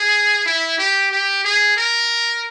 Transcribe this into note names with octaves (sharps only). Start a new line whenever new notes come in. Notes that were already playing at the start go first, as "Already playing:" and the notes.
Already playing: G#4
E4
G4
G4
G#4
A#4